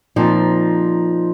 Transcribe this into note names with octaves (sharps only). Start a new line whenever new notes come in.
A#2 F3 C4 D#4